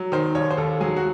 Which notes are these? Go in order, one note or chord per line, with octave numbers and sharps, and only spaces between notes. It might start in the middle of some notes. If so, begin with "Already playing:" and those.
Already playing: F#3
D#3 C5
D#2 C#5
C5
D#2 A4
F#3 G#4
F#4